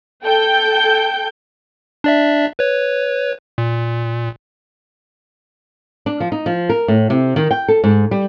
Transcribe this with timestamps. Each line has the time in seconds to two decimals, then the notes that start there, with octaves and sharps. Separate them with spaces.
0.24 A4 G5 G6
2.04 D4 D5 E5
2.59 B4 C#5
3.58 A#2
6.06 D4
6.20 F3
6.32 D#4
6.46 F3
6.69 A#4
6.88 A2
7.10 C3
7.36 D#3
7.51 G5
7.68 A4
7.84 G#2
8.11 G3